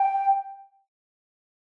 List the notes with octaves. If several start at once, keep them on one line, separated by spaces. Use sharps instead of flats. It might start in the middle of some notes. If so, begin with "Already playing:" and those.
Already playing: G5